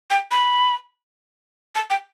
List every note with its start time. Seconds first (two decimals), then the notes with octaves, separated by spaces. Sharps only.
0.10 G5
0.31 B5
1.75 A5
1.90 G5